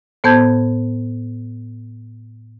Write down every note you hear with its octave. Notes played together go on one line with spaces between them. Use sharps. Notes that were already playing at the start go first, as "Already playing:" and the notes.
A2 B3 C5 A5 G6 G#6